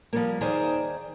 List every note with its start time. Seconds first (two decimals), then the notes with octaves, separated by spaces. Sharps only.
0.13 F3 G3 A#3
0.41 D#2 D#3 G#4 C5 D5 A#5